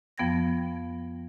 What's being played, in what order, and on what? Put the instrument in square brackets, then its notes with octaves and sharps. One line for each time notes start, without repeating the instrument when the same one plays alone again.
[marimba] F2 F3 B3 G5 G#6 A#6